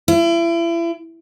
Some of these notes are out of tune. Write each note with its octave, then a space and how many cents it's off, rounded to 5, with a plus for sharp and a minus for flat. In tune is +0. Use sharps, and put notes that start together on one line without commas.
E4 +35